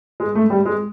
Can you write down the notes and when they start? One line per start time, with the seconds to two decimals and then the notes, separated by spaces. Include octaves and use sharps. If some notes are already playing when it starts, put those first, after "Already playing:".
0.20 G#3
0.35 A3
0.50 G3
0.65 G#3